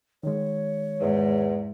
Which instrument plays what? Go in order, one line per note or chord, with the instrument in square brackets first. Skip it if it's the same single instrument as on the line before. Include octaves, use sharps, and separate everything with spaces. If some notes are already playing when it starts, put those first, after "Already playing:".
[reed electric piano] D#3 G#3 [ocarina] C#5
[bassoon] E2 [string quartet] G#2